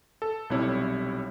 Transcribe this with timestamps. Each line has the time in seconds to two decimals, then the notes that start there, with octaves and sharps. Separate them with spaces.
0.22 A4
0.50 B1 C3 G3 E4 C#5